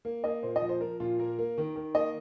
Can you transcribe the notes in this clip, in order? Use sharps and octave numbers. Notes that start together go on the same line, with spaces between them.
A#3
A#3 D#5
A#2 C5
D#5
F3
C5
F3 A#4
A#2 F4
A#3 A#4
A#3
D#3
D#3
A#3 D#5